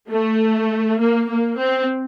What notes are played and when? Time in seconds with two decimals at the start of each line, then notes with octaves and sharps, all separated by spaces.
0.11 A3
1.00 A#3
1.30 A#3
1.60 C4